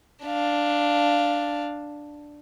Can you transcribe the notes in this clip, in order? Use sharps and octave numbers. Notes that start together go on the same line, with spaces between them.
D4 F5